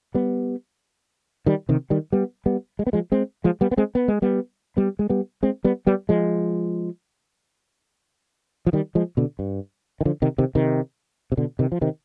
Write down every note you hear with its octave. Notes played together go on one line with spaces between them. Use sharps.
G3 B3
D#3 G3
C3 D#3
D#3 G3
G3 B3
G3 B3
G#3
B3
F3 G#3
G#3 C4
F3 G#3
G3 B3
B3
G#3 C4
B3
G#3
G3 B3
G3 B3
G#3
G3 B3
G#3 C4
G3 B3
G3 B3
F3 G#3
F3
D#3 G3
F3 G#3
B2 D3
G2
D#3
D3 F3
C3 D#3
C3 D#3
C3 D#3
C3
B2 D3
C3 D#3
F3
C3 D#3